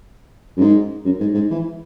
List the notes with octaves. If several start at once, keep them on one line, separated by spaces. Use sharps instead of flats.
F#2
G#2
F#2
G#2
G#2
E3